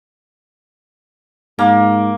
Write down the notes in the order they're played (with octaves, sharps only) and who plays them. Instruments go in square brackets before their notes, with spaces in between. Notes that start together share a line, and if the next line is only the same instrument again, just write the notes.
[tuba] G#2 [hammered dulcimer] A#3